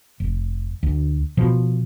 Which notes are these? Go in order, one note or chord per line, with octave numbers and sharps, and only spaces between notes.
F1
D2
B2 F3